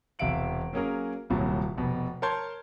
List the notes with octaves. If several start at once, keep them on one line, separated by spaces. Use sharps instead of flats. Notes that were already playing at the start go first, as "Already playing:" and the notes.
E1 C3 E5 F5 D7 F#7
F#3 A#3 C#4 G#4 A#4
D#1 C2 A#2 F#3
F1 B2
A#4 C#5 A5 C6 G6 G#6